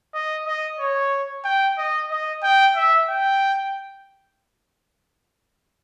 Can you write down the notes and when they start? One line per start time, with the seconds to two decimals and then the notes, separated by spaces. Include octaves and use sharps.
0.14 D#5
0.46 D#5
0.79 C#5
1.44 G5
1.78 D#5
2.10 D#5
2.43 G5
2.76 E5
3.09 G5